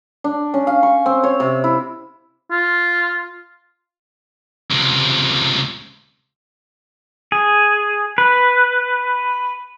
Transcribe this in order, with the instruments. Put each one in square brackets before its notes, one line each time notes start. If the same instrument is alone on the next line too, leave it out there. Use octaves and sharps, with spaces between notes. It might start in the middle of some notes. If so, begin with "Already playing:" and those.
[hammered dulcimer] D4
C#4
F5
C#6
C4
C#5
C3
E4
[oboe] F4
[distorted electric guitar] C#2 C3
[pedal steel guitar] G#4
B4